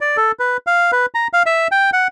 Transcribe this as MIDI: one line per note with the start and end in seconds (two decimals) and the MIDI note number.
0.01 0.17 74
0.17 0.32 69
0.39 0.57 71
0.67 0.91 77
0.92 1.06 71
1.15 1.28 82
1.33 1.43 77
1.46 1.68 76
1.72 1.90 79
1.93 2.08 78